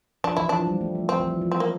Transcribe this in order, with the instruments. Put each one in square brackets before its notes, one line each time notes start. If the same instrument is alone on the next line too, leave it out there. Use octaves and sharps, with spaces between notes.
[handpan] F3 [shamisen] D4
[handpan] E3 [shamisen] E4
[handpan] F3 [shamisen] D4
[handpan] G3
A3
F3
[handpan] F3 [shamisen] C4
[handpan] E3
F3
F3
[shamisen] C4
A#3